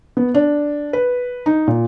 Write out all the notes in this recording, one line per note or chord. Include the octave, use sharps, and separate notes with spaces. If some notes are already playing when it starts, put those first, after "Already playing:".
B3
D4
B4
D#4
A#2